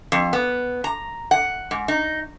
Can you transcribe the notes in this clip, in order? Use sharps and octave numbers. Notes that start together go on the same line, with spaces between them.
F2
B3
A#5
F#5
G#2
D#4